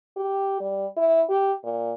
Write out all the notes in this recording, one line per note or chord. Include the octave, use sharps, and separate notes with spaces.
G4
G3
E4
G4
A#2